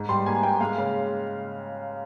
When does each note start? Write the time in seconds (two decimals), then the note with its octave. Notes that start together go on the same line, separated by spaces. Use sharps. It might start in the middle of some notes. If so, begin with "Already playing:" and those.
Already playing: G#2
0.09 G3 C6
0.26 A#3 G#5
0.43 A#3 G5
0.61 G#3 F5
0.78 C#3